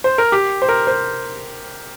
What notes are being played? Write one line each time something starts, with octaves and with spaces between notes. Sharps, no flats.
C5
A#4
G4
C5
A#4
C5